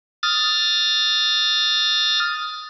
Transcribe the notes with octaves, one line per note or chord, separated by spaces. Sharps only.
D#6 F6 A6